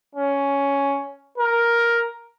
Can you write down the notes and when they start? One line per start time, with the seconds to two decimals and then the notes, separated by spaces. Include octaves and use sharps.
0.15 C#4
1.38 A#4